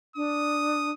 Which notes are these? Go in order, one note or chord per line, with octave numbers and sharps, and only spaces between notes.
D4 D#6